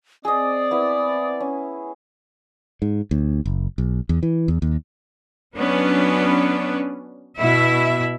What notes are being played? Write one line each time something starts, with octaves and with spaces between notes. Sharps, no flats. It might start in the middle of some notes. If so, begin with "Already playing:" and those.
C4 G#4 D5 D#5 D#6
B3 E4
C#4
G#2
D2
F#1
B1
E2
E3
E2
D#2
F#3 B3 C#4 D4 B4
B2 E4 E5